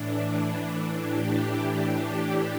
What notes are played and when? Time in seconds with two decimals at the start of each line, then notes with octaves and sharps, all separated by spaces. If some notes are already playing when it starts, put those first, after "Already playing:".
Already playing: A2 E3 D4
1.06 G4